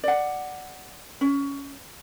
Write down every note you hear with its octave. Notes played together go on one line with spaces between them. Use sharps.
D5 F#5
C#4